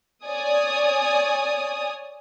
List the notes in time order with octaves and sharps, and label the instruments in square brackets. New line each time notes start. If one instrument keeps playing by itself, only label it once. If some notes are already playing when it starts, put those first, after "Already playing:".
[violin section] C#5 D5 G#5 D#6